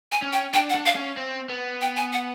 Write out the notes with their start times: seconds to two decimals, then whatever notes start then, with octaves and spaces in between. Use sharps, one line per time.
0.12 G#5
0.22 C#4
0.33 G5
0.54 D4 G5
0.70 F#5
0.75 D4
0.86 F5
0.96 C#4
1.17 C4
1.49 B3
1.81 G5
1.97 G#5
2.13 F#5